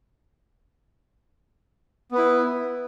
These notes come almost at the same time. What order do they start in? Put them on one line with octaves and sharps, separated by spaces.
B3 B4 E4